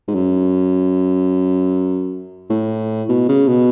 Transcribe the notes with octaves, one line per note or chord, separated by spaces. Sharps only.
G#2
F#2
A2
B2
C#3
B2